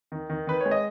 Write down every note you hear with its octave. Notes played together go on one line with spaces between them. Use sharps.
D#3
D#3
D#3 B4
G#3 C#5
D#5